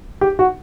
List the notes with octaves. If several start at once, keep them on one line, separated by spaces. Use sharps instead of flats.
G4
F#4